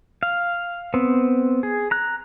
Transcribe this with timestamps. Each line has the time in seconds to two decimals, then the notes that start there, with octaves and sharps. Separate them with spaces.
0.23 F5
0.94 B3 C4
1.63 G#4
1.91 A#5 F#6